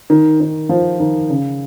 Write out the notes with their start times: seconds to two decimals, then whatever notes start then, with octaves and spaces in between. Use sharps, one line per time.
0.10 D#3
0.41 D#3
0.69 F3
1.00 D#3
1.29 C#3